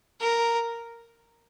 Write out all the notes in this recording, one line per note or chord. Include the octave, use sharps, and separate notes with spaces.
A#4